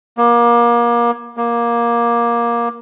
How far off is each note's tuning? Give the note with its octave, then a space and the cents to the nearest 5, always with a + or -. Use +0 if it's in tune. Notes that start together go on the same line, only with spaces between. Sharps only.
A#3 +30
A#3 +15